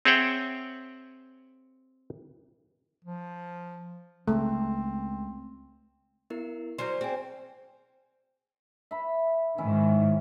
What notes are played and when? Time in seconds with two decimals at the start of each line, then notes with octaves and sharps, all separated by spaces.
0.05 C4 G#4 C#5 E5 F#5 G5
3.05 F3
4.28 C#2 C#3 G#3 A3 C4
6.30 B3 E4 A#4
6.78 F#3 C#4 C5 D5 G6
7.01 C4 G#4 G#5
8.91 E5 B5
9.58 G#2 D#3 C#4 E4